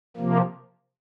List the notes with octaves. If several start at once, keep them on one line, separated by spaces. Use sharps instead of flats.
C3 F3 A#3